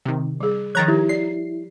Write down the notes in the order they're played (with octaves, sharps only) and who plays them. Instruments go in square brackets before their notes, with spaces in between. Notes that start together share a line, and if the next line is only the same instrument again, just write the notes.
[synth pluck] C3 D#3
[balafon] G3 G#4
[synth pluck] D#3 A#5 G#6 [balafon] F3 [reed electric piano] F#6 A6
[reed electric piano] E4 [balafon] G4
[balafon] D5 [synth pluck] C7